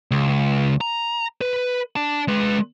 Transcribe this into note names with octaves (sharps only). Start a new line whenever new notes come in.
C#2
A#5
B4
D4 A5
G#3 B4